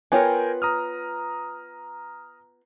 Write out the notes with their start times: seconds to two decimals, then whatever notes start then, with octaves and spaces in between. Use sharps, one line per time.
0.12 B3 F4 A#4 C#5 G5 G#5
0.62 A#5 D#6 F6